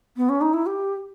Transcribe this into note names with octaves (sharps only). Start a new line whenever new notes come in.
B3
C#4
D#4
E4
G4